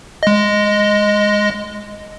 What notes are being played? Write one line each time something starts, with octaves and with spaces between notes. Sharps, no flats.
G#3 D#5